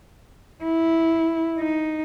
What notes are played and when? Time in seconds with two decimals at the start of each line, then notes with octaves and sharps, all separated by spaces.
0.64 E4
1.59 D#4